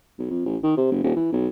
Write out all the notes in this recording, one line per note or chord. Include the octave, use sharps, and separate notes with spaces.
B1
F2
A1
D#3
C3
F#1
D#1
E3
B1